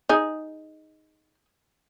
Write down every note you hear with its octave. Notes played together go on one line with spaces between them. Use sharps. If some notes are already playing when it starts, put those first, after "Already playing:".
D#4 G#4